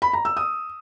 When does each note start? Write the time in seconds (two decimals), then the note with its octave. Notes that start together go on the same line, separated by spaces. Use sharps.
0.02 B5
0.13 A#5
0.25 E6
0.37 D#6